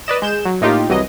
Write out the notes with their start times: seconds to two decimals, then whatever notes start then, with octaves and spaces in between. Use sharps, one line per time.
0.07 B4 D5 D#5 E7
0.22 G#3 G6 E7
0.45 F#3
0.61 A2 A#3 D#4 F4 G4
0.89 C2 E3 F#3 D#5